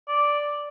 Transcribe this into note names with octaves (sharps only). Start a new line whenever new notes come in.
D5